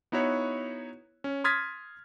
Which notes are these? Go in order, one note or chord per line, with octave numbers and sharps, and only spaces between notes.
B3 D#4 E4 F#4 C#5
C#4
C6 D#6 F6 G#6 A6 B6